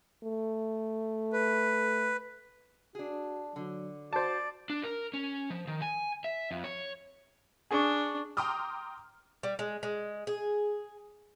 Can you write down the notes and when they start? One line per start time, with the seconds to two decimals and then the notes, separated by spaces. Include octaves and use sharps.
0.24 A3
1.33 B4
2.95 D4 F#4 G#4
3.56 D3 F#3
4.13 F#4 C5 D5 A5
4.70 D4
4.83 A#4
5.14 C#4
5.50 F3
5.67 D#3
5.82 G#5
6.24 E5
6.51 F2
6.64 C#5
7.71 D4 G#4 C#6
8.37 G5 A#5 C6 D6 D#6 F6
9.43 G3
9.59 G#3
9.83 G#3
10.27 G#4